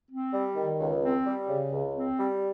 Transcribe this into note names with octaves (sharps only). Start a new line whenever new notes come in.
C4
G3
D#3
C#2
C4
G3
C#3
C#2
C4
G3